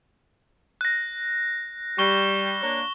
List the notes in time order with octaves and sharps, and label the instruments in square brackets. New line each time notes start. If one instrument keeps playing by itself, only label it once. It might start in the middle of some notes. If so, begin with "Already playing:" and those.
[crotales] F#6 A#6
[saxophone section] G3 [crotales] C#6 G7
[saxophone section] A#3 D4 C#5